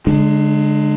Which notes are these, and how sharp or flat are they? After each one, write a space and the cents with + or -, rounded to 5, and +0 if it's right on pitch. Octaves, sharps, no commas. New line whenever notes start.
D3 -35 G#3 +0 D4 +30